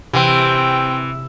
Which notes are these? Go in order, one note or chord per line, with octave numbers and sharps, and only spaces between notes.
C3 E3 C4 G5